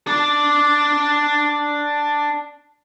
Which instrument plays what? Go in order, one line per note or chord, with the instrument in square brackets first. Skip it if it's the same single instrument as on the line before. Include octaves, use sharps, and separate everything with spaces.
[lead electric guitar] D4 D5